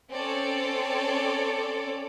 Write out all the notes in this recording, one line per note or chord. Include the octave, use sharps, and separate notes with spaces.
C4 C#4 A4 C#5 D5